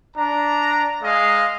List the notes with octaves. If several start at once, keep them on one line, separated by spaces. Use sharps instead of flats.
D4 A#5
G#3 D#5 F5